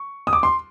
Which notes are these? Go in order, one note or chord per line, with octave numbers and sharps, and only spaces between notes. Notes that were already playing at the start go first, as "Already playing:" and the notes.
Already playing: C#6
D#6
D6
C6